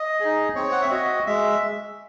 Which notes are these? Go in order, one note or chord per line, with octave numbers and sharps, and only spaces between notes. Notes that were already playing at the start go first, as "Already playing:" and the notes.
Already playing: D#5
D#4 G#4
C4 C#5
F#5
E5
F#4 D#5
G#3 E5